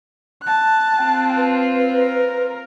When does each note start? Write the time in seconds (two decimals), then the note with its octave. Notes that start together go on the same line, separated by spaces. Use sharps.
0.42 A5 F#6
0.97 C4 F4 G5
1.37 B4
1.97 A#4